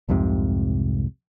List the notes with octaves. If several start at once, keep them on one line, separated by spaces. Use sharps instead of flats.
C2 F2 G#2 C3